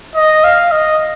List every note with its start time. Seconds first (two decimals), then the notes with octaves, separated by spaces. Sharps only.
0.15 D#5
0.44 F5
0.71 D#5